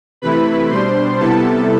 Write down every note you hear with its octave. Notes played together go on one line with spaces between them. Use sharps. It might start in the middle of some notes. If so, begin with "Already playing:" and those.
C3 E3 A3 E4 B4 B5
B2 G3 D4 C5 C6
C3 G3 B3 E4 A4 A5